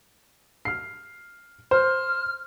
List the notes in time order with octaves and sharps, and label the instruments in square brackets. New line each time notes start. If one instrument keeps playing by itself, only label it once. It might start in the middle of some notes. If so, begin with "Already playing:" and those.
[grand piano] F6 C7
[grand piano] C5 [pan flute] F6